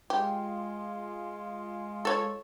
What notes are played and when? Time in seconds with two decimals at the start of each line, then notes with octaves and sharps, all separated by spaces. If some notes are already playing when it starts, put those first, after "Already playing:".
0.10 G#3 F4 G4
2.05 A4 C#5